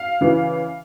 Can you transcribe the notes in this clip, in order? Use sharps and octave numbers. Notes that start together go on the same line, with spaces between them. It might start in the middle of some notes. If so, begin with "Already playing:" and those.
Already playing: F5
C#3 E3